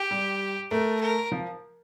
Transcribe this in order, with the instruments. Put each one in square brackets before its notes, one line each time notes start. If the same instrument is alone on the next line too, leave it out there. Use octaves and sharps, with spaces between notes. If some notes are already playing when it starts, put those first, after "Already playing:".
Already playing: [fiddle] G4
[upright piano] G3
[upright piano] A3 [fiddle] A#4
[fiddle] A#4
[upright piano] F3